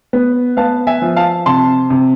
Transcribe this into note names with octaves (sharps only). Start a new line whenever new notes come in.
B3
B3 F5 A5
E5 G#5
F3
F5 A5
C3 A5 C6
C3